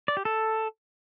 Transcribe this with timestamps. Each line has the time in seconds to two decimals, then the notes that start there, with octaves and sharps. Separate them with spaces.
0.08 D5
0.17 G4
0.25 A4